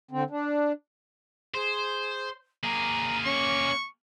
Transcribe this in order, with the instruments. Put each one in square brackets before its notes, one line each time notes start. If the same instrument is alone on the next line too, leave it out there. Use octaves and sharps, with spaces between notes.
[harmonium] D3 C4
D4
[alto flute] G#4 [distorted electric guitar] C5
[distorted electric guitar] A#3 G#4 [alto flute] A#5
[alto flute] C#4 [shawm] C#6